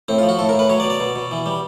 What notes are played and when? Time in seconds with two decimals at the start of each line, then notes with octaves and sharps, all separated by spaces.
0.08 A2 C4
0.18 F4
0.23 F3
0.29 F#4
0.39 A2 A4
0.49 A#4
0.54 A2
0.59 B4
0.70 F#3 C#5
0.80 D5
0.85 B2
0.90 D5
1.00 B2
1.16 B2
1.31 E3
1.46 G3